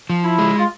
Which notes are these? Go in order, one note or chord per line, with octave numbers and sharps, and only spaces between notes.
F3
E4
G#3
F4